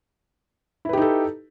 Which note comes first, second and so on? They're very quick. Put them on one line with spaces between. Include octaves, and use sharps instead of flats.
E4 B4 G4 D#4 A4